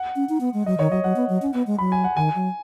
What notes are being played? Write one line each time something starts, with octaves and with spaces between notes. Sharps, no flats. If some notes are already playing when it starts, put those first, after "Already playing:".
Already playing: F#5
C#4
D#4
B3
G#3
F#3 D#5
D#3 C#5
F#3 D#5
F#3 F#5
B3
F#3
C#4
B3
G#3
F#3 B5
G#5
F#5
D#3 G#5
F#3